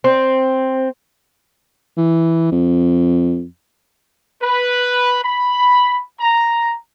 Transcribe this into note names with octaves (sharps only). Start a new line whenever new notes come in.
C4
E3
F2
B4
B5
A#5